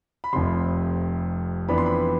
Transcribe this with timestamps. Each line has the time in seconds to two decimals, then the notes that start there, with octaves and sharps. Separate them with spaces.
0.24 B5
0.33 F1 F2 C3 C6
1.68 F2 E3 B3 D4 B5
1.78 C6
1.86 B5